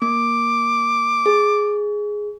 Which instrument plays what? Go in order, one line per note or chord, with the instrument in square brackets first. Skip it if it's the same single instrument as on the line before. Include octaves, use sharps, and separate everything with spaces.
[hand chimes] A#3 [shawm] D6
[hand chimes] G#4